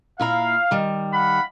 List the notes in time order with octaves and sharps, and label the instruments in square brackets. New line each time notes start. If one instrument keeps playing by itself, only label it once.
[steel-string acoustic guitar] A#2 E4 A#5 [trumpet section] F5
[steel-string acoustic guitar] D#3 G3
[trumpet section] F5 F#5 B5